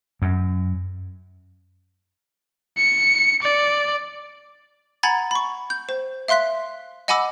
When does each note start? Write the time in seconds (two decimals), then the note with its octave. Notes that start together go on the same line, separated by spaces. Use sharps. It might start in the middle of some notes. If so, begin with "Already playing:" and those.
0.22 F#2
2.78 C#7
3.43 D5
5.03 F#5 G#5 A#5 B5 G#6 A6
5.31 B5 C#6
5.70 G6
5.89 C5
6.28 E5 F5 C6 F#6 B6
7.08 D#5 F#5 G#5 B5 D6 E6